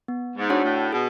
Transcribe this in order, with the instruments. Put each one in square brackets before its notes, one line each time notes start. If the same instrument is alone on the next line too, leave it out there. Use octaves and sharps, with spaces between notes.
[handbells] B3
[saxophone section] G#2
[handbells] D4 F#4 C#5 F#5
[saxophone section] A2
[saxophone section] B2 [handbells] G#4